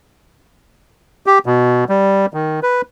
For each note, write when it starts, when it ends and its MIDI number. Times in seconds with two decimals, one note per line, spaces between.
1.26 1.39 67
1.46 1.84 47
1.89 2.26 55
2.34 2.60 51
2.63 2.82 71